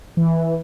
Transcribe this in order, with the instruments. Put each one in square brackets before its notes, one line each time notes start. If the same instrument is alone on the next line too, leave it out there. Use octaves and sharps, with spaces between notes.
[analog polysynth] E3